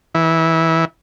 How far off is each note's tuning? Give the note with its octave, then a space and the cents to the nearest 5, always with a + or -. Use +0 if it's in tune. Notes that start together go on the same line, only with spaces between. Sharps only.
E3 -20